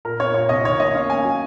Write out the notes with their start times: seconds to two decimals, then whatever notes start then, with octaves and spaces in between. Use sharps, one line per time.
0.05 A#2 A#4
0.20 C4 C#5
0.34 A#2 C#5
0.49 C2 D#5
0.65 D#3 C#5
0.80 A#3 D#5
0.95 C#4 F5
1.10 A#3 G#5
1.25 F#3